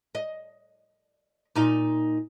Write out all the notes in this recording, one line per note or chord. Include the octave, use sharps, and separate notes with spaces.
D#5
A#2 D#4 F4